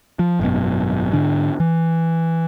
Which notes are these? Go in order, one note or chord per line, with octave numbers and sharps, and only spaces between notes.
F3
G#1 F#2 B2
G#2 D3 D4
E3